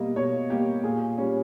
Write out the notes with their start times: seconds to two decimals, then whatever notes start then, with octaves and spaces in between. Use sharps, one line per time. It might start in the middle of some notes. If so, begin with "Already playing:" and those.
Already playing: B2 G3 A#3 D#5
0.16 B2 C#5
0.50 G3 A#3 G4
0.84 A#2 G#4
1.18 G3 C#4